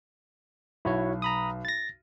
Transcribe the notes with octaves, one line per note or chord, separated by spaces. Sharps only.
B1 E4 F#4 C#5
A#5 B5 D#6
A6 A#6